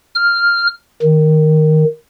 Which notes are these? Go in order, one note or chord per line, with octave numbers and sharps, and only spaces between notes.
F6
D#3